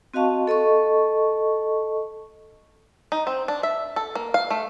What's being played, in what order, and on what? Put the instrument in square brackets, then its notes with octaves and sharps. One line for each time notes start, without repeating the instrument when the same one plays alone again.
[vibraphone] C4 F#4 D#5 F5 A5 C#6
A4 D#5 A5 C#6
[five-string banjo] D#4
C4
D4
E5
A4
A#3
F5
A3